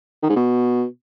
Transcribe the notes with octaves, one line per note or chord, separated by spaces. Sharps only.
D#3
G#2
B2